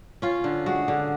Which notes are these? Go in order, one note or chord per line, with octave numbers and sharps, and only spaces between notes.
C#4 F4
D3
G#3 F#4
D3